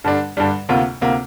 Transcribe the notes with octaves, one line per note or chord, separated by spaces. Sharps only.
G2 D3 G3 D4
G2 D3 G3 D4
D2 C3 A#3 F4
D2 C3 A#3 F4